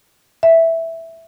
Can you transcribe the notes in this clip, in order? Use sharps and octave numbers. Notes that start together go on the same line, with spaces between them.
E5